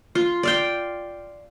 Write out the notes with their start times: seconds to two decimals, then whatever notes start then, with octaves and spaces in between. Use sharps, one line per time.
0.15 F4
0.43 D5 F5 G5